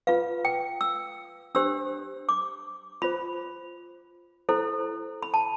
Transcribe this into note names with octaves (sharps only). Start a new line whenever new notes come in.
F4 B4 F5
G5
E6
D4 G4 C5 E6
D6
F4 C5 B5
E4 A4 C5
B5
A5